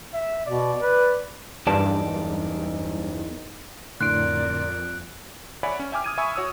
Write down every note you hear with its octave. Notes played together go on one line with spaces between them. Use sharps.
E5
B2 D5
B4
F#1 E2 G2 D#4 D5 A5
F2 A2 D3 A#4 D5 C6 F#6 D7
C#5 D5 E5 F#5 G#5 B5
C#4
E5 G5 G#5 D6 F6
D#6 G#6 D#7
E5 G#5 B5 C#6 E6
F#4 C#5 D#6 E6